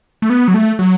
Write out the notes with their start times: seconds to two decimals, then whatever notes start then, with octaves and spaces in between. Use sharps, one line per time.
0.22 A3
0.30 B3
0.48 F#3
0.54 A3
0.79 F#3